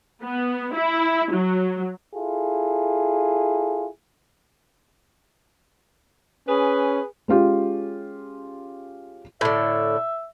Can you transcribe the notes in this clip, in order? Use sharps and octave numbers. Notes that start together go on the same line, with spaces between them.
B3
E4
F#3
E4 F4 G#4 A4
C#4 G#4 B4
G#3 C#4 F4 G4
A2 D3 E5